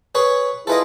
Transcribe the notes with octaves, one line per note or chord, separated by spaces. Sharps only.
G#4 B4 C#5
E4 F4 G#4 A4 B4 D#5